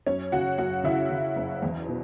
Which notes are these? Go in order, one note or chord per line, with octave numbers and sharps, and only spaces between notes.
F#2 C#4 C#5
C#3 F#4 F#5
F#2 F#4 F#5
C#3 E4 E5
C#3
F#1
E2
B2